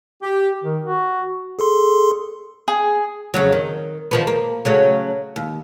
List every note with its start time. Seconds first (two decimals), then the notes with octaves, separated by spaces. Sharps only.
0.22 G4
0.64 D#3
0.84 F#4
1.59 G#4 A4 C6
2.68 G#4
3.34 F2 C#3 F#3
3.53 D#3
4.11 D#3 F3 B3
4.27 A#3
4.65 C#3 F#3 A3
5.36 D#2